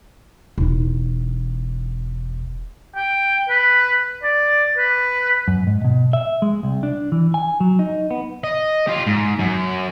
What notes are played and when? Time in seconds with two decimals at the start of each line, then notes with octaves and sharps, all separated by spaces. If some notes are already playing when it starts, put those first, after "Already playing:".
0.58 E1 D#4
2.95 G5
3.49 B4
4.23 D5
4.77 B4
5.48 F#2
5.67 G#2
5.84 B2
6.13 E5
6.42 G#3
6.63 C2
6.83 D4
7.12 E3
7.34 G#5
7.60 F#3
7.79 D#4
8.11 B3
8.44 D#5
8.87 F4 G4
9.07 G#2
9.40 F#2